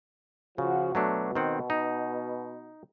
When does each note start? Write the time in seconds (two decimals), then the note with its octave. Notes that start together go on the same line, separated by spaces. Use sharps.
0.58 C#3 F3 F#4
0.95 B2 F#3 A3 D4
1.36 D#3 C4 F#5
1.70 D#4